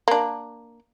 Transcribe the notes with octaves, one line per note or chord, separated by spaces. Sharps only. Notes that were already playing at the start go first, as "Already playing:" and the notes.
A#3 D4